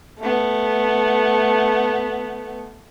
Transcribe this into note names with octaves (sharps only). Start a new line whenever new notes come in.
A3 B3